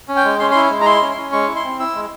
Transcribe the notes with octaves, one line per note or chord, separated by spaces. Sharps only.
C#4
G5
G#3
C#4 C6
E4 C6
G#3
A#5
E4 C6
C#4
C#4
G#3 C#6
E4
C6
C4
E4 E6
G#3